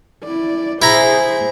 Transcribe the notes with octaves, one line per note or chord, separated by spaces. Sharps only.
E4 D5
E4 G#4 C5 A#5